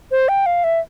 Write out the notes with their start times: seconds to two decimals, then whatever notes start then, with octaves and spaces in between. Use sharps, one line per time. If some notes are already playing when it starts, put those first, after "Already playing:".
0.11 C5
0.29 G5
0.46 F5
0.64 E5